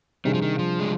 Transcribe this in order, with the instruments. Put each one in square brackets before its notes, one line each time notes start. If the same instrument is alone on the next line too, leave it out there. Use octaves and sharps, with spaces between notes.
[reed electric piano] C3 G3 D4 G#4 [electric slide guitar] D#3
[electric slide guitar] F3
D#3
F3
G#3